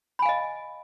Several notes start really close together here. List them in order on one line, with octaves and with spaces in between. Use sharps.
B5 G#5 F5 D#5